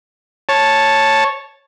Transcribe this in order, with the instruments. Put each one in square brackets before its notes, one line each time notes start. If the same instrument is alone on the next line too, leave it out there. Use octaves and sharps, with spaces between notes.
[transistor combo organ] C#5 A5